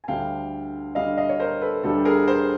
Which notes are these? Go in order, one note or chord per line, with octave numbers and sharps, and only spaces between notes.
G#5
D2 D3 G3 F5 G5
D2 D3 G3 D#5 F5
D#5 F5
C#5
A#4 C5
A4 B4
D2 D3 G3 A4
G#4 A#4
A#4 C5